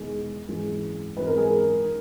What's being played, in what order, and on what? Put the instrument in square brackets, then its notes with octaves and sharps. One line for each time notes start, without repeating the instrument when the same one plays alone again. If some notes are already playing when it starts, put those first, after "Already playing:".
Already playing: [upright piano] E1 E2 D#3 G#3 G#4
G#1 F#2 E3 G#3 G#4
G#1 F#2 E3 G#3 B4
A#4
G#4
A#4
D#3